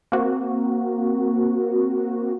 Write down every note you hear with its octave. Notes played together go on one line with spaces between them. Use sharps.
A#3 C4 F#4